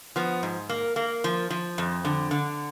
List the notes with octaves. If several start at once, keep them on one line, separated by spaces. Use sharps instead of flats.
F3 B3
G#2
A#3
A#3
F3
F3
F2
D3
D3